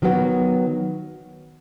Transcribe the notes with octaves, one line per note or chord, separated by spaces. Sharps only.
D#3 F#3 B3 F#4